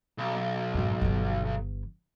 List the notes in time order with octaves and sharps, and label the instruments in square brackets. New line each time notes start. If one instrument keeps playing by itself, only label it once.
[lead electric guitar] B1
[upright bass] G#1 F2
G1 E3